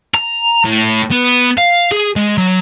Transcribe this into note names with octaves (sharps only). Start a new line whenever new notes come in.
A#5
A2
B3
F5
G#4
G#3
F#3